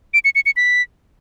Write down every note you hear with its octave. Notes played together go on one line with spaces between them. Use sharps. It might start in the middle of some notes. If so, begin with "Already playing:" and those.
D7
C#7
C#7
C#7
B6